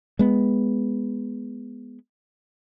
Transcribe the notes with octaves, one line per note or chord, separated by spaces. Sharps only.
G#3 B3